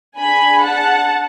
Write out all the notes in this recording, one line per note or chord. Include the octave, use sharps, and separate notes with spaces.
D4 G#4 G#5 B5
F#5 A5